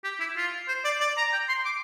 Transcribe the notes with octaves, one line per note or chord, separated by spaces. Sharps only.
G4
E4
F4
C5
D5
D5
A#5
G5
C6
D6